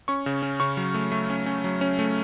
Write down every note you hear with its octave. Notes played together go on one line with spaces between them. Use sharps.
C#4 C#6
C#3
C#4
C#3 C#6
F#3
A3
A3
C#4
C#4
F#3
C#4
A3